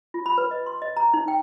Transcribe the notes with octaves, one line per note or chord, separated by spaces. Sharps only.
F4
B5
B4
D#5
C6
D#5
A#5
D#4
G5